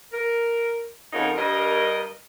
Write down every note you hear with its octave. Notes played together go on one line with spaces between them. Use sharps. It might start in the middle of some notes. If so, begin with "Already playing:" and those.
A#4
F2 C#3 D#4 F4 A#4 F#5
G2 A#4 D#5